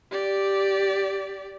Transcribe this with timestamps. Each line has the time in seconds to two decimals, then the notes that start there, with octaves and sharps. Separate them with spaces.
0.11 G4 D5